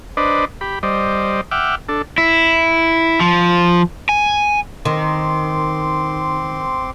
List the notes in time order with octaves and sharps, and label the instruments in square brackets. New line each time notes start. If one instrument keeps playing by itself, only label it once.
[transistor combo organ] D4 B4 C5 D5 D#5
G4 B5
G3 C5 D5 D#5
E5 F#5 G5 D6 F6
D4 A4
[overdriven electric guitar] E4
F3
G#5
[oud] D#3 [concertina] C4 C6 D6